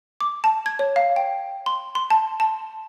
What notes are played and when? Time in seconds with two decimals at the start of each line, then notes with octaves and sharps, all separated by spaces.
0.21 D6
0.44 A5
0.66 G#6
0.79 C#5
0.96 F5
1.16 G5
1.66 C6
1.95 C6
2.10 A5
2.40 A5